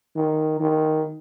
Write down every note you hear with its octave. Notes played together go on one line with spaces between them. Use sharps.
D#3
D#3